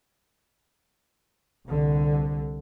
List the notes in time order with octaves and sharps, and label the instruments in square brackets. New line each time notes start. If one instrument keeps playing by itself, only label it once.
[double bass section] C2 D3